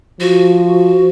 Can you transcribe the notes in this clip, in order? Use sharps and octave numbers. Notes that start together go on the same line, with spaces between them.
F3 F#4